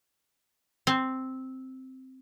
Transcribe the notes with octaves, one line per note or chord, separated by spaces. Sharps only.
C4